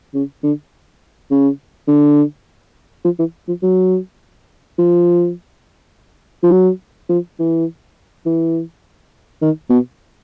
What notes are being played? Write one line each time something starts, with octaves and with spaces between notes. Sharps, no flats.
C#3
D3
C#3
D3
F3
E3
F3
F#3
F3
F3
F#3
F3
E3
E3
D#3
B2